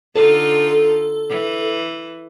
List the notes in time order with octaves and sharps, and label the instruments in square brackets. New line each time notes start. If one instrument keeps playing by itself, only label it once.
[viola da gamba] D3 D#4 F4 [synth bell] A4
[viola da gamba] E3